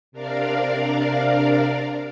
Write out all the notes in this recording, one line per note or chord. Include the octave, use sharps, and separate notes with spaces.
C3 D4 A#4 D5 F5